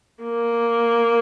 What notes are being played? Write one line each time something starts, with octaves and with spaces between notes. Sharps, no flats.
A#3